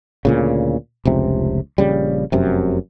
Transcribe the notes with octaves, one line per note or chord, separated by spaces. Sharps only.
D2 A#2 C#3
F1 C#2 C3
A#1 C#3 G3
F1 F#2 C3